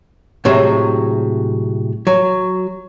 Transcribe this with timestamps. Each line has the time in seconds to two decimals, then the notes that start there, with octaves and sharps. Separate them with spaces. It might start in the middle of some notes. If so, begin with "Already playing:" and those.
0.45 A2 C3 F#3 G#3
2.07 F#3